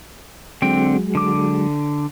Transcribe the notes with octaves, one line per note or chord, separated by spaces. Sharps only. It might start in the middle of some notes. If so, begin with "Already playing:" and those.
D3 F#3 G#3 C4 G5
D3 D6